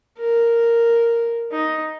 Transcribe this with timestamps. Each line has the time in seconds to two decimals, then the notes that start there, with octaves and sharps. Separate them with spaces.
0.18 A#4
1.52 D#4